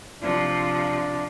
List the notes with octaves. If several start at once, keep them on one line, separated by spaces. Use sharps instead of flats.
C3 F3 D4